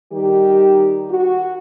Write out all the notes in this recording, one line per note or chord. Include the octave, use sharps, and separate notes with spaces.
D#3 G3 G4
F#4